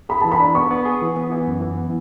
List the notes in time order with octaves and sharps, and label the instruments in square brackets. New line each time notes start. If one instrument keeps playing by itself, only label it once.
[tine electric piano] G#4 [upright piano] B5
[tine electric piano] E3 [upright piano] A5
[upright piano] B5
[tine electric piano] D4
[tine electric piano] B3 [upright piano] C#6
[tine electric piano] B3
G#4
E3
B3
E3
F#2
E3
B3